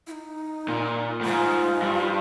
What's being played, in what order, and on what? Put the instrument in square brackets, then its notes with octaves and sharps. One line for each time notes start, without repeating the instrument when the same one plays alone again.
[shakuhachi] E4
D#4
[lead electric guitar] A#2
A2
[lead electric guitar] G#2 [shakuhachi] F4
[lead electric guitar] G2